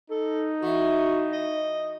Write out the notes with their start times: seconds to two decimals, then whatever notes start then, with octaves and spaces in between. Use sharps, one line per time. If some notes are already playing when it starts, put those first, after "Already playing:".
0.10 D#4 A4
0.62 E3 F#4
1.32 D#5